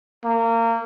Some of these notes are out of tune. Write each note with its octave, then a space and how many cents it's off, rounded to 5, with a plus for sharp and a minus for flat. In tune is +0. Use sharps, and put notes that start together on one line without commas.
A#3 -25